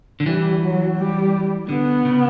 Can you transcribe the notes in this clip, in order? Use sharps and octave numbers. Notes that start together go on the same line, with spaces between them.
D3
E3 G3
F#3
G3
D3 B3
C#3